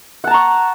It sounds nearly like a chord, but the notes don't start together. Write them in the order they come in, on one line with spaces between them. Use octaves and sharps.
F#5 A5 A#5 C#6